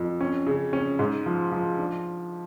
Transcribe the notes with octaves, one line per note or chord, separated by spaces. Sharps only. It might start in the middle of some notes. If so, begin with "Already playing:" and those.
Already playing: F2
C#4
C#3
C#4
G#2
F3
F3
D4